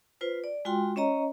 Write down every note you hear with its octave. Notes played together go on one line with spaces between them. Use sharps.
F4 B4 C5
D5
G#3 F4 F#4 G5 C6
C#4 C#5 D#5 A#5